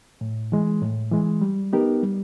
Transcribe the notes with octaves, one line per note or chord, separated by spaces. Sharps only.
A2
E3 G#3
A2
E3 G#3
G3
B3 D#4 G4 A#4
G3